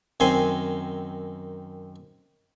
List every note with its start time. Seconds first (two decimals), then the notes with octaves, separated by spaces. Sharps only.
0.20 F#2 D#3 C4 G#5 C6